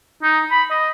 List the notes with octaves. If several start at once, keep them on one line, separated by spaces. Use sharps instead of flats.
D#4
B5
D#5